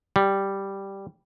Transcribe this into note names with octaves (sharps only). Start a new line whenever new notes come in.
G3